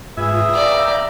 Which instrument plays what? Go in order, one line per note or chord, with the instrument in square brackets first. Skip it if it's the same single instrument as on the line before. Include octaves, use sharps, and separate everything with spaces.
[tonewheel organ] G#2 F4 G#5 [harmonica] G#4 B4 [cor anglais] E5
[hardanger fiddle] D5 [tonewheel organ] F5 G5 A#5